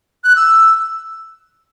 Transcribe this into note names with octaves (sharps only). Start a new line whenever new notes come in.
F#6
E6